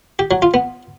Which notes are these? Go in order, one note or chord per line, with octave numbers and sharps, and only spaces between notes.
G4
F#3
F4
B3